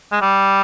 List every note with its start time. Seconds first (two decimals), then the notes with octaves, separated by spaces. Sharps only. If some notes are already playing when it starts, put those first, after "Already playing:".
0.12 G#3
0.21 G3